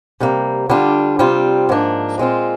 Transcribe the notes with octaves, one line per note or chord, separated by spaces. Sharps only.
C3 G3 A#3
D3 G3 D4 F4
C3 G3 C4 F4
G#2 F3 A#3 D4
A#2 G#3 C4 F4